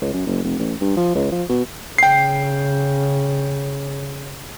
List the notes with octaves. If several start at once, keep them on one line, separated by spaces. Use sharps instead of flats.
C#2
F#2
F#1
F1
A1
G2
F3
C#2
F3
B2
C#3 G5 C7